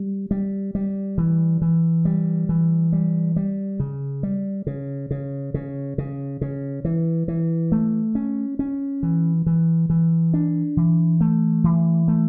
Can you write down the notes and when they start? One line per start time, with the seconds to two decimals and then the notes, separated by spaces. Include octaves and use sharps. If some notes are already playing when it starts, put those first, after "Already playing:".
Already playing: G3
0.31 G3
0.75 G3
1.18 E3
1.62 E3
2.05 G3
2.49 E3
2.93 G3
3.36 G3
3.80 C#3
4.23 G3
4.67 C#3
5.11 C#3
5.54 C#3
5.98 C#3
6.41 C#3
6.85 E3
7.28 E3
7.72 A3
8.15 C#4
8.59 C#4
9.03 E3
9.46 E3
9.90 E3
10.34 D4
10.77 E3
11.21 A3
11.64 E3
12.08 A3